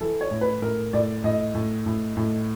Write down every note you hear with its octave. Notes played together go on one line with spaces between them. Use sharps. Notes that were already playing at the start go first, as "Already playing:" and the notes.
E3 A4
C#5
A2
B4
A2 A#4
A2 D5
A2 D#5
A2
A2
A2